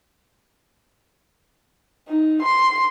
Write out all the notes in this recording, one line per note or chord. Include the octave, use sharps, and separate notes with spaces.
D#4
C6